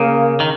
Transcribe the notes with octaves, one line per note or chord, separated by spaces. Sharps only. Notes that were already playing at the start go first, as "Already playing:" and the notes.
Already playing: C#3 A#3
D#3